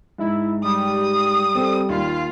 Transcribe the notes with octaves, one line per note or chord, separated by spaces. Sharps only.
G#2 E4
G3 D#6
C4 A4
D#2 F4